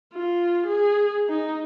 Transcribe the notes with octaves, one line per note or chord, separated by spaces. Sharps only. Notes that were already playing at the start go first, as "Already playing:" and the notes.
F4
G#4
D#4